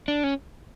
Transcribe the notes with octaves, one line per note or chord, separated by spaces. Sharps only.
D4
C#4